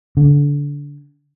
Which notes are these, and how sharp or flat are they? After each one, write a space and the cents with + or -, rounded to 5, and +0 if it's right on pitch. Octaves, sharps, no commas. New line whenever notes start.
D3 -25